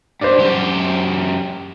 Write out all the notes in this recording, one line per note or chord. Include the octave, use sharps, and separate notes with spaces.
G2 C5 D5
F#2 G4